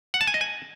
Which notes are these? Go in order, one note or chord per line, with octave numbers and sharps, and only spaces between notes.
F#5
A5
G#5
D#5
G#5